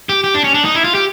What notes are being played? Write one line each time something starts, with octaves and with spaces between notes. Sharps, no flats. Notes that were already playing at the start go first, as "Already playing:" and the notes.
G4
G4
D4
C#4
D4
D#4
E4
F4
G4